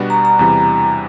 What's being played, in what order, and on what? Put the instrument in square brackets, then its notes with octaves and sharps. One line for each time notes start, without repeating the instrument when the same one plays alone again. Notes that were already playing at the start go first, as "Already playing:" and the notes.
Already playing: [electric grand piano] B2 G3 B3 D4 F#4
[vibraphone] A#5
A#5
[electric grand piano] E2 C3 E3 G3